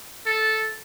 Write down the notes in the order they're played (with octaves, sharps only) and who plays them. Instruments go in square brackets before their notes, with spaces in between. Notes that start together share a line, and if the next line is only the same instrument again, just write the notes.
[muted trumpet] A4